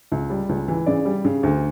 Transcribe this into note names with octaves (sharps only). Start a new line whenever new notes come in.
C#2
G3
C#2
E3
C#3 D5
G3
C#3
D2